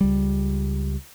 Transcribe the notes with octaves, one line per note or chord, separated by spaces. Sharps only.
C#2 G3